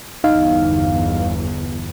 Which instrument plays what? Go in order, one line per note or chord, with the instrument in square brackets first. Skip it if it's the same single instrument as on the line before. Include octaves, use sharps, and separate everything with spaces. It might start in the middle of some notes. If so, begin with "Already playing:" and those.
[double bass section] G1 E2 [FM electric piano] D#4 F5